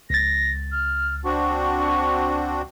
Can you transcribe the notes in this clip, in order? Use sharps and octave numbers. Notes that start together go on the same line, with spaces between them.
C#2 A6 A#6
F6
C4 D4 F#4 C#6